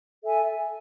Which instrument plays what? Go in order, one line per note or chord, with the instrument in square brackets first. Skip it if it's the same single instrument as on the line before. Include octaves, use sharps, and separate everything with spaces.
[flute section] A4 E5 G#5